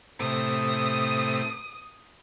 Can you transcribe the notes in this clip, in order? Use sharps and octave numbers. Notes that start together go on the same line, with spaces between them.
A2 C3 D#6